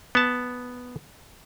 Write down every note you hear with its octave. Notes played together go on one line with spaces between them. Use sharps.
B3 A5